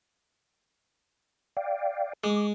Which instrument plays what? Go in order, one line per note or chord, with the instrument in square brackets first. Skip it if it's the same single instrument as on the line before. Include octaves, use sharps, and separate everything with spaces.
[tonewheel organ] D5 F5 G5
[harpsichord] G#3 [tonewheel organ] D6